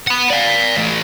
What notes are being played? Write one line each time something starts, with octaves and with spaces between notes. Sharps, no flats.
F#5 B5
D5 F5
E3 A3